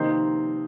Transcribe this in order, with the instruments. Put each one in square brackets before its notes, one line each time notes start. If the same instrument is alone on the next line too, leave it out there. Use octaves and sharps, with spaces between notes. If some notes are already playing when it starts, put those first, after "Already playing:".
Already playing: [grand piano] C3 F3 [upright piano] D#3 A#3 D#4 C5